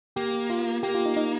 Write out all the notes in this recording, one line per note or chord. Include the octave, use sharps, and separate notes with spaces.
A#3 G4
F4
A#3 G4
F4
D#4
D#4